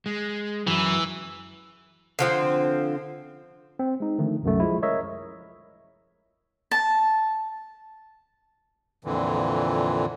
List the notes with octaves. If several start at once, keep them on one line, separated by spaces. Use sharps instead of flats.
G#3
F#2 E3
D3 F3 C4
C4
G#3 D#4
D3 D#3 F3 A3
C2 F#2 A3
F3 G#3 E4
A#4 C#5 D#5 E5
A5
F2 A#2 D3 E3